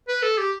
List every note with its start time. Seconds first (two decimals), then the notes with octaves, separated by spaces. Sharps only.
0.08 B4
0.22 A4
0.38 G4